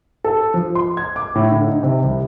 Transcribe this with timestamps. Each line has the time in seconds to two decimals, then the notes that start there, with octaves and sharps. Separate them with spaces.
0.24 A4
0.54 F3
0.75 C6
0.97 G#6
1.16 D6
1.35 A2
1.52 D3
1.67 D#4
1.83 C3
2.04 C2